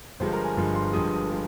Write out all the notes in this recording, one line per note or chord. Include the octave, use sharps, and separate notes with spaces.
G1 G2 F3 G#3 C5
A#4
G#5
G1 G2 F3 G#3
C6
G1 G2 F3 G#3 D#6
D#6
F3 G#3